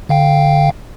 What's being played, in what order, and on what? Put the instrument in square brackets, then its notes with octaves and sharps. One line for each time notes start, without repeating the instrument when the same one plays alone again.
[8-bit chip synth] D3 F5 G5